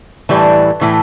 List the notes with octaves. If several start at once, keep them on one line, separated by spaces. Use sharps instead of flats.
A2 E3 G3
A2 E3